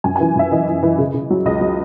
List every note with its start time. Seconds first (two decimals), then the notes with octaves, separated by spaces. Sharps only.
0.04 F#2 G#5
0.16 E3 G#5
0.36 F#2 E5
0.52 E3 D#5
0.68 E3
0.83 E3
0.98 C#3
1.14 C#3
1.30 F#3
1.45 C#2 D#5
1.61 F#3